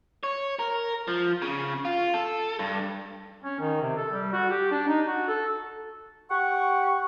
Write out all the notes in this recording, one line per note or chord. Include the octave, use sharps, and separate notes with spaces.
C#5
A#4
F3
C#3
F4
A4
G2
C#4
D#3
C3
A4
G3
F#4
G4
D4
D#4
F#4
A4
G4 F#5 C#6